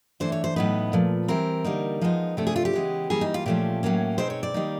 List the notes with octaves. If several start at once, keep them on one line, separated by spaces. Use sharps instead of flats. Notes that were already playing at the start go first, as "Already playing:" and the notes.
E3 A3 D4 C5
C#5
C5
A2 F#3 B3 D#4 B4
A#2 F3 A3
E3 G3 C4 A#4
D3 G3 A#3 D#4
F3 G#3 B3 D#4
C3 F3 A3 D4 A4
G#4
F4
G4
C#3 E3 G#3 B3
E3 G3 A#3 G#4
D#4
F4
A#2 F3 A3 C#4 G4
A2 F#3 A#3 C#4
B2 G#3 C4 D#4 C5
C#5
D5
D#3 G3 A#3 D#4